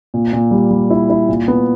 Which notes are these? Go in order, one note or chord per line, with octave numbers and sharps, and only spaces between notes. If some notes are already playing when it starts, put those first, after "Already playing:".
A#2
A#2
G3
G3
E4
E4
A#2
B3